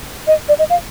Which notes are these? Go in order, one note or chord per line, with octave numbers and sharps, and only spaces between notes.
D#5
D5
D#5
F5